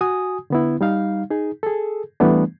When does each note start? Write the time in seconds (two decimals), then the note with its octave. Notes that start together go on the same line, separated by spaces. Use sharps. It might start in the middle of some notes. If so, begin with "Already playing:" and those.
0.01 F#4 G#5 D#6
0.50 D3 B3 E4
0.81 G3 D#4 F5
1.31 D#4 G#4
1.63 G#4 A4
2.20 E3 G3 A3 B3 D4